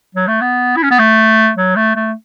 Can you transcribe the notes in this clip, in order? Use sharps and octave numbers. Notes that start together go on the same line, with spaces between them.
F#3
A3
B3
E4
C#4
B3
A3
F#3
A3
A3